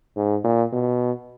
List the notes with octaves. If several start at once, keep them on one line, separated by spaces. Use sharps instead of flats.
G#2
A#2
B2